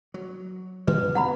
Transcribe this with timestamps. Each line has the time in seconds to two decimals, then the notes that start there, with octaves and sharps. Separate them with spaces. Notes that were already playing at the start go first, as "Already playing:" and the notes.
0.14 F#3
0.87 F#2 D3 C4 B4
1.15 B2 F#5 A#5 B5